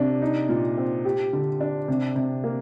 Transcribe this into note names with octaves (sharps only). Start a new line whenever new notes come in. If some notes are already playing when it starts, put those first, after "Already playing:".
Already playing: C3 D4
D#4
A#2
C4
G4
D3
D4
C3
C3
A#3